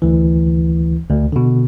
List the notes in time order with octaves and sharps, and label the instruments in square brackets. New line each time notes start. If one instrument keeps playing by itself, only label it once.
[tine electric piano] D2 E3
D2
B2 D3